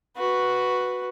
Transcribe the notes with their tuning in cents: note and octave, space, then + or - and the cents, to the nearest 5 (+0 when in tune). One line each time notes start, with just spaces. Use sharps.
F#4 +0 B4 +0